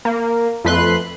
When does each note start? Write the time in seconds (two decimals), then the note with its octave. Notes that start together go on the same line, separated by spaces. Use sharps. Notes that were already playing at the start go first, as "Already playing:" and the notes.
0.05 A#3
0.65 F2 A3 B4 C6 F#6